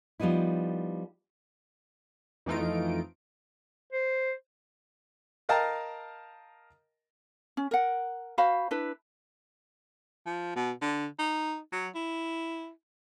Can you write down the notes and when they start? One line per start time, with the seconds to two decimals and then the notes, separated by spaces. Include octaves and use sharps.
0.20 F3 G3 B3 D#4 E4
2.46 F2 E3 A3 D#4 F4 D7
3.93 C5
5.49 A#4 D#5 F5 G5 A5 A#5
7.57 C#4
7.71 A#4 F#5
8.38 F#4 C5 F5 B5
8.71 D4 E4 B4
10.26 F3
10.56 B2
10.82 D3
11.19 D#4
11.72 F#3
11.95 E4